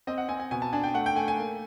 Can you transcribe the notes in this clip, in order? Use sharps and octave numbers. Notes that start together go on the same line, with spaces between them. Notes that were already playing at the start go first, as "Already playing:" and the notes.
C4 D#5
F#5
C4 G#5
G#5
B2 G#5
A5
D4 G#5
G5
A3 F#5
G5
A3 G#5
G#5
A#3